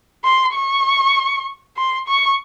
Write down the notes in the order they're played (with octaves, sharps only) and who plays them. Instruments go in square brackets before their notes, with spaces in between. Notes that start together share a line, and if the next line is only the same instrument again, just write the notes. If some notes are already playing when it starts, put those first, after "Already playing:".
[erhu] C6
C#6
C6
C#6